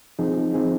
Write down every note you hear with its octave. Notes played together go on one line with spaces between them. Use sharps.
F3 C4 D#4 G#4
F3 C4 D#4 G#4